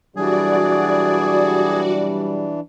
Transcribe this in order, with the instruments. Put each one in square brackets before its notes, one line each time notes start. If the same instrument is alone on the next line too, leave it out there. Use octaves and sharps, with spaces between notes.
[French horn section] B2 F#3 G3 [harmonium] E3 D4 [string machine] F#4 D5 [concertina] G#4